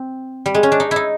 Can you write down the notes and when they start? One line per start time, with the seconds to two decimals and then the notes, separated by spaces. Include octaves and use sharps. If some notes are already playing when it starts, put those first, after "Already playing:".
Already playing: C4
0.46 G3
0.55 G#3
0.63 C#4
0.72 D4
0.80 D#4
0.91 D#4 E4